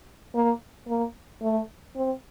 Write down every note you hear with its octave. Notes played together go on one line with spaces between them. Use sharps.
A#3
A#3
A3
C4